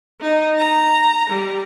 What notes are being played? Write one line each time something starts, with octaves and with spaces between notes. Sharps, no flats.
D#4
A#5
G3